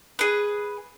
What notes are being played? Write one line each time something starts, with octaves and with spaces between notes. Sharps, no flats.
G#4 B4